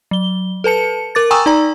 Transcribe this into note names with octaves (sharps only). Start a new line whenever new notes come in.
F#3 G7
A4 B4 A5 C#7
A#4 D6 A6
G5 G#5 A#5 C#6 D#6 E6
D#4 D5 A#5